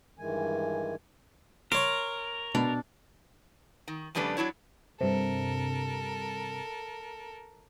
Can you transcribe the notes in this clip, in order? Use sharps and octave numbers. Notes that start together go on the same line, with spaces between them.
G2 D#3 E3 G#3 G#5
A#4 C#5 C6 D6
B2 D4
D#3
F2 C#3 G3 A3 D4 B4
F#3 D4 E4 C#5
G2 C3 A4 A#4